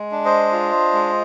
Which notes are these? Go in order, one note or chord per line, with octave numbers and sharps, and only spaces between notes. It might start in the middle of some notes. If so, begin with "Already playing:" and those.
Already playing: G#3
D4
C5 D#5
F4
G#3